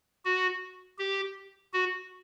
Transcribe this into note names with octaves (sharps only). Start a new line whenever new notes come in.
F#4
G4
F#4